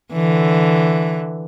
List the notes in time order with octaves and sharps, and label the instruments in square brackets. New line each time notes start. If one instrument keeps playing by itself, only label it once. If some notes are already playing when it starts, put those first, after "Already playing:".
[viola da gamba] D3 E3